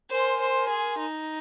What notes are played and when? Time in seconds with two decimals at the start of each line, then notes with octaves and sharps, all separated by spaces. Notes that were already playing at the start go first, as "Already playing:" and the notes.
0.11 A#4 C5 G#5 C6
0.41 C5
0.70 G#4
1.00 D#4